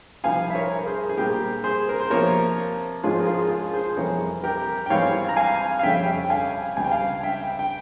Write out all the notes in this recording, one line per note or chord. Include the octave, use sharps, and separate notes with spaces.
C2 C3 F3 F5 G#5
E5
A#4 C#5
A#4
G#4 C5
G#4
A#2 G3 C4 G4 A#4
G#4 C5
A#4
C5
C3 F3 A#3 A#4 C#5
G#2 F3 G#3 C#4 F4 G#4
A#4
F4 G#4
F4
G#4 C5
C5
F2 C3 E3 G3 A#4 C#5
G4 A#4
G5
G#2 E3 G3 C4 C#5 F5
A#5
F5 G#5
F5
F2 C#3 G3 C#4 E5 G5
G5
F5 G#5
C#2 C3 G3 G#5
G5
F5 G#5
E5 G5
G5